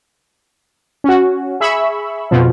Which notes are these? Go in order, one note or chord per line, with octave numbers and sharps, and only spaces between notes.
C#4 F#4
G#4 E5 B5 C#6 E6
F2 B2 F3